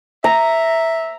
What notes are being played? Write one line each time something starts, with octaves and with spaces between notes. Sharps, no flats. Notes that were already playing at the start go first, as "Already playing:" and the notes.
E5 A#5